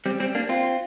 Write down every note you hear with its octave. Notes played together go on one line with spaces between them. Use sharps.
G3 C4
G3 C4
A#3 D4
C4 F4